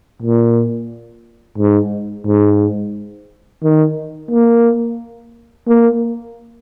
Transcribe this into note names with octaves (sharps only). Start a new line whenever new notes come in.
A#2
G#2
G#2
D#3
A#3
A#3